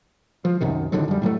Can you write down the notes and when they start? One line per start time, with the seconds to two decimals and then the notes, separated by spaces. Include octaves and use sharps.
0.45 F3
0.61 C2 F#2 C3 D#3
0.92 A1 D3 D#3 F#3
1.08 F#2 G3
1.22 A2 F#3 G#3 A3